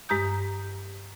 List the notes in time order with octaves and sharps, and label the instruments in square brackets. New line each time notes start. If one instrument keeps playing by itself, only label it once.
[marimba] G2 G#3 G4 A#5 D#6 G6